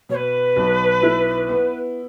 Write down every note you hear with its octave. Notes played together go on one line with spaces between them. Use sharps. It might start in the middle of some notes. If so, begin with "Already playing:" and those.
B2 C#5
B4
B1
E4
B3